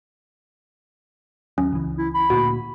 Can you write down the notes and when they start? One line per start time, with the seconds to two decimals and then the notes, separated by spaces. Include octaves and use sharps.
1.58 D#2 F#3 C#4
1.72 C#2 E3
1.97 E4
2.14 B5
2.30 D2 A#2 A#3 F#4